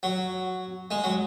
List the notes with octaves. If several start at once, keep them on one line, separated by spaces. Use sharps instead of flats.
F#3
G#3
F#3